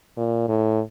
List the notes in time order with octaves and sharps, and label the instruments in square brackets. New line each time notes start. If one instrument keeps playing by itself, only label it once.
[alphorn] A#2
A2